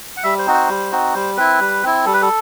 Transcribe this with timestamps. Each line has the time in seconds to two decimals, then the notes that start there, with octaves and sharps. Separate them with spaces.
0.17 F#5
0.24 G3 E5
0.39 C5
0.46 C4 D#4 F#4
0.54 C5
0.69 G3
0.92 C4 D#4 F#4
1.15 G3 C5
1.37 C4 E4 B4
1.60 G3
1.83 C4 E4
2.05 G3 A4
2.14 B4
2.22 A4